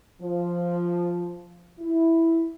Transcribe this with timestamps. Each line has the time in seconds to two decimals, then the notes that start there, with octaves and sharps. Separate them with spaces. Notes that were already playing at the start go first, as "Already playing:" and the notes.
0.22 F3
1.79 E4